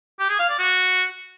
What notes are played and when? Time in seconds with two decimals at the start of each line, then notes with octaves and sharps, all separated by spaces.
0.19 G4
0.29 G#4
0.39 F5
0.49 D5
0.59 F#4